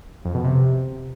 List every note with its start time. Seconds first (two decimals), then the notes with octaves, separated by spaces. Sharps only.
0.25 F2
0.34 B2
0.44 C3